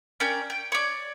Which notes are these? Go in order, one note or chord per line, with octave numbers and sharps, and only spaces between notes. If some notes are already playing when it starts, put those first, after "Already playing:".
C#4 A#4 D5 G5
G5
C#5 D5